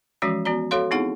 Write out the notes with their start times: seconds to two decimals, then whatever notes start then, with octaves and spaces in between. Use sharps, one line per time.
0.22 E3 F3 G#3 C#4 F#4 D6
0.45 B3 F#4 D5 A#5
0.71 F#4 A4 C#5 F5 C6
0.91 B3 C4 D#4 E4 G#4 F#5